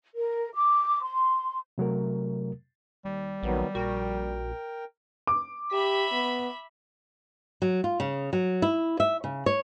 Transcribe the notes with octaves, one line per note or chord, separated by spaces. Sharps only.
A#4
D6
C6
C3 F#3 A3 A#4
D#2 G3
A#1 D#3 F#3 B3
A#1 F#4 A#4 G5
D6
G4 E5 B5
B3
F#3
F4
C#3
F#3
E4
E5
C#3
C#5